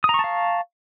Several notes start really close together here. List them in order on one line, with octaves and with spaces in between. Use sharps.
D#6 A#5 C#6 A5 F5